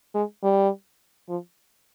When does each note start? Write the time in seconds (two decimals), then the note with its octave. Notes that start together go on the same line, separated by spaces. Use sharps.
0.14 G#3
0.43 G3
1.29 F3